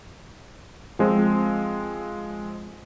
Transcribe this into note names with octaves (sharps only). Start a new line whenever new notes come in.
F3 G#3 C4